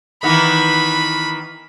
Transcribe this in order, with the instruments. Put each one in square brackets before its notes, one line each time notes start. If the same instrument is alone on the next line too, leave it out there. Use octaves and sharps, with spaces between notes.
[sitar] D#3 E3 B3 [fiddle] B5